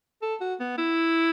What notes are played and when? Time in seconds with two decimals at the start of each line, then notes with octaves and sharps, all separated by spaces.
0.22 A4
0.41 F#4
0.60 B3
0.78 E4